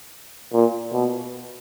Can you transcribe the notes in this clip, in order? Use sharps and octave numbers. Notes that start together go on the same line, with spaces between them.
A#2
B2